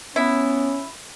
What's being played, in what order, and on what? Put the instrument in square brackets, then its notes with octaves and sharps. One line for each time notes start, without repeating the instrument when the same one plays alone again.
[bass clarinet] B3 [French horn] C#4 [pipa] E4